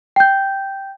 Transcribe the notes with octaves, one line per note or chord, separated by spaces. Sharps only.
G5 G6